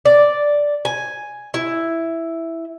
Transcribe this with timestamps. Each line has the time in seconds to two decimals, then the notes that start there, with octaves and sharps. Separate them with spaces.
0.05 D5
0.85 G#5
1.54 E4